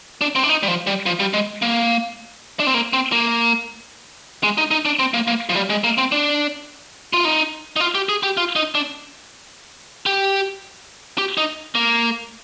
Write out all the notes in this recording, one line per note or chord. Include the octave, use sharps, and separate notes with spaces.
D4
C4
D4
D#4
G3
F3
G3
F3
G3
G#3
A#3
D4
C4
A#3
C4
A#3
G#3
D#4
D#4
D4
C4
A#3
A#3
F3
G3
G#3
A#3
C4
D4
F4
D#4
D#4
F4
G4
G#4
G4
F4
D#4
D4
G4
G4
D#4
A#3